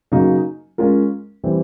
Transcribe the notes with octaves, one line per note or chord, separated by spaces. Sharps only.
C#3 F#3 A#3 D#4
G#3 C#4 F4 A#4
E3 G3 C4